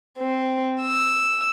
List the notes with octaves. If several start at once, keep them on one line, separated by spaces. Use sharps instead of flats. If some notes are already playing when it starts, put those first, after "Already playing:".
C4
E6